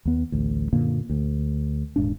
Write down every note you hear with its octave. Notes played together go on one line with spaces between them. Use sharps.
D#2 B3
A1 D2
F#2 A#2 D3 A#3
D2
D#1 G#2 D4